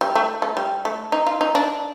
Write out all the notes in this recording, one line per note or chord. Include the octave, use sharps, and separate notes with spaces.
G3
A3
A3
G3
A3
D#4
F4
D#4
D4